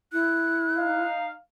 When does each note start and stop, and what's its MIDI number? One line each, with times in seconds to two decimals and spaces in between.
0.13 1.02 64
0.13 1.08 90
0.77 1.34 63
0.77 1.34 77